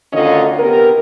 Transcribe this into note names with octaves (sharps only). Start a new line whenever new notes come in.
D2 D3 D#3 C#4 F4 D#5
C3 B3 G4 A#4